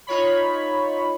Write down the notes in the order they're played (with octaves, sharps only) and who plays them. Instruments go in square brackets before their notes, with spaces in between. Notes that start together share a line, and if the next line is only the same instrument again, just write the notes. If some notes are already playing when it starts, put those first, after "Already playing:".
[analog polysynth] D#4 F4 C#5 B5